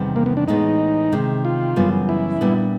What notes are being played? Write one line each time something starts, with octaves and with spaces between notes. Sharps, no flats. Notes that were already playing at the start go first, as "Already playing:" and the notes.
Already playing: E2 C3 D#3 G3
A#3
B3
D4
A2 E3 G#3 B3 D#4
C3 D#3 G#3
F4
F#2 C#3 E3 G3 B3
E4
A#2 G3 B3 D4